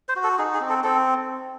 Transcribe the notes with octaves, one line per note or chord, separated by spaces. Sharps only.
C5
F#4
A4
D#4 G#4
G#4
C4
A4
C4 A4